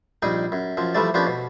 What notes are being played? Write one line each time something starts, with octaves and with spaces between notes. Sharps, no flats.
A#1 G3 D#4 G#4 G5 D#6
F#2
F#2 F3
E3 F3 G3 A3 D5
F3 A#3 B3 C#4 D4 G4
B2